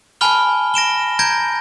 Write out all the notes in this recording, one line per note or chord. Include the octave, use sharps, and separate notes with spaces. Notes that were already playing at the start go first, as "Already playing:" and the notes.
G#5 A5 B5 F6 G7
A#6 D7 E7 G7
A#5 G6 G#6 A#6 D7